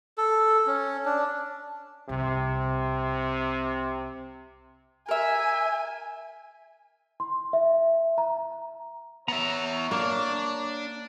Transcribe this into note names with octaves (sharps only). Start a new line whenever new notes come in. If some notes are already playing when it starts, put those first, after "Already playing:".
A4
C#4
D4
C2 C3
A#4 E5 G#5
C6
E5
A#5
B3 C#5 E5 A#5
A#3 D4